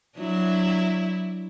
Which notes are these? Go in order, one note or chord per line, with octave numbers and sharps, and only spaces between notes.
F#3 D4 E4